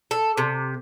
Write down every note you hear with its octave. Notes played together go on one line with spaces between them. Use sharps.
A4
C3